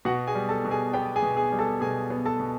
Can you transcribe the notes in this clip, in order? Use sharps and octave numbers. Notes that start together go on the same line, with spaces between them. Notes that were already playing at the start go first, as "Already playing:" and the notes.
B2 F#4 F#5
G#4 G#5
G3
A4 A5
B2
G#4 G#5
B3 G4 G5
G#4 G#5
B2
G#4 G#5
G3
A4 A5
B2 G#4 G#5
B3
A4 A5
B2